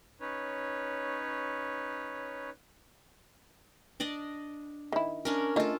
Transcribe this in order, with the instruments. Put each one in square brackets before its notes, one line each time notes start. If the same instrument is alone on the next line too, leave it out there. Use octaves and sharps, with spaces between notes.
[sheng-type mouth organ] C#4 D#4 B4 C#5
[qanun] D4 D5 D#5
[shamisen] D#3 E4
[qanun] C#4 D4 A#4
[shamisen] A3 D#5 [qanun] F4 A4